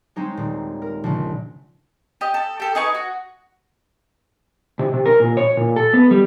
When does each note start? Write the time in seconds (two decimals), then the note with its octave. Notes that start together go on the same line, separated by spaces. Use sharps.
0.16 G#3 C4 D#4 C#5
0.37 D#1
0.82 A#4
1.04 A#1 C#3
2.21 G4 D#5
2.34 A4
2.60 G4 A4
2.75 D#4 G#4 B4 C#6
2.95 F#4
4.79 C3
4.93 C3
5.06 A#4
5.20 A#2
5.37 C#5
5.57 A#2
5.76 A4
5.93 B3
6.11 G3